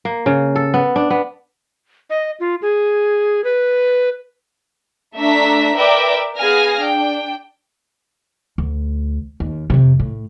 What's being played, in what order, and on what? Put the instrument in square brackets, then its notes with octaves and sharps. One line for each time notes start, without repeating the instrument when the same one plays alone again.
[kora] A#3
C#3
A4
B3
D4
B3
[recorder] D#5
F4
G#4
B4
[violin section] A3 D4 E5 A#5 B6
A#4 B4 D5 E5 G5 D6
B3 G#4 F5 G#5 F6 A#6
D4 G5
[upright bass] D2
D#2
F2 C3
A2